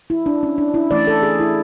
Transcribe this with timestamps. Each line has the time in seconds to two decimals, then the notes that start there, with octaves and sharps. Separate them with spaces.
0.10 E4
0.26 D4
0.43 C#4
0.58 D4
0.74 E4
0.91 E3 A3 C#4 D5
1.07 A4
1.23 G#4
1.40 E4